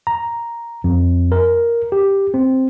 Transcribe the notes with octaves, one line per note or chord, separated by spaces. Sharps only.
A#5
F2
A#4
G4
C4